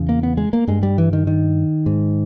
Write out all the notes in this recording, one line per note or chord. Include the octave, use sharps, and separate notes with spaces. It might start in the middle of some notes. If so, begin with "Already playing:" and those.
Already playing: E2 C#3
A#3
B3
G#3
A#3
G2 G#3
G3
E3
D#3
D#3
G#2